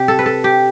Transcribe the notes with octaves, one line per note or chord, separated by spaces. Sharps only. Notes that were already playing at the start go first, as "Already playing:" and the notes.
Already playing: C3 G4
A4
B4
A4
G4